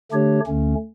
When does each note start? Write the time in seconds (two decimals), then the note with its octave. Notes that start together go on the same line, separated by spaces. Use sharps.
0.12 D3 A3 D4 G4 C#5
0.47 D2 D3 A3 C#4